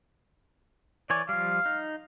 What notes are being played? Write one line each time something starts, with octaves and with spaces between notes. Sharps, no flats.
E3 C#5 D5 G#5
F3 G3 F5
D#4